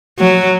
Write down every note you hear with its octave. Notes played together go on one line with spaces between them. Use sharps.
F#3